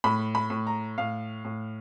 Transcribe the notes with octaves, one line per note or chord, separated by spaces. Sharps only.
A2 B5
B5
A2
A#5
A2 F5
A2